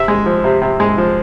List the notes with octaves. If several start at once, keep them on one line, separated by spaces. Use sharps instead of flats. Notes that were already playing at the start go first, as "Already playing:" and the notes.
Already playing: C3 E5
G#3
F3
C3
C3
G#3
F3